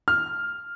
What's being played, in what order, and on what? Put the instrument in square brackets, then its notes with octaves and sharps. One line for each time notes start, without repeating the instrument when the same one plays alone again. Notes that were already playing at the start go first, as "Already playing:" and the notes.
[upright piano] F6